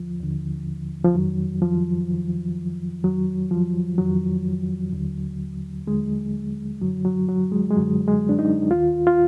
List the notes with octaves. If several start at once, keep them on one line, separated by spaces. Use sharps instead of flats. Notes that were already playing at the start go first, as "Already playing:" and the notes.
Already playing: D#2 D3 F3
D#2 D3
F3
F2 D#3 F#3
F3
F2 D#3
F2 D#3 F#3
F3
F2 D#3 F#3
D#2 D3
D#2 D3 G#3
F#2 D3 F#3
F#3
F#3
G#3
G#3
F#2 D3 F#3
G#3
D4
D#4
D#2 D#3 F4
F4